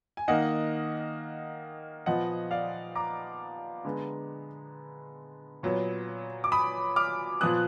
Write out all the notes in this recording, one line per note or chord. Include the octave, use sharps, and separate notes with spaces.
G#5
D#3 A#3 D#5 F#5
A#2 F3 B3 D#5 F#5
D5 F5
A#5 D6
D3 G#3 B3
A#2 F#3 B3
D6
B5 D#6
D6 F6
A#2 F3 B3 D#6 F#6